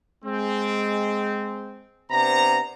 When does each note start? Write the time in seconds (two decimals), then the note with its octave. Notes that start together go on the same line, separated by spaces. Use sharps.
0.25 G#3 C4
2.11 C3 B3 D4 C5 A#5